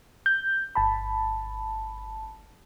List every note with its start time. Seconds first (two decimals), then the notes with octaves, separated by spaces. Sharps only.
0.26 G6
0.75 G1 A5 B5